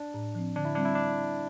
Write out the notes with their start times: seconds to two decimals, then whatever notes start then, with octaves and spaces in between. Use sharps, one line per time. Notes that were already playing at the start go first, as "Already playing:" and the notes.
Already playing: D4
0.14 A2
0.35 F3 C4
0.56 D3 D4
0.65 E4
0.75 G3 C4 D4
0.85 E4
0.95 D4